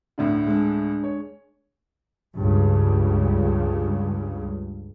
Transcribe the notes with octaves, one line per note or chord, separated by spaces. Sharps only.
D2 A2 D3
G#3 D4
C#5
C#2 G2 C#3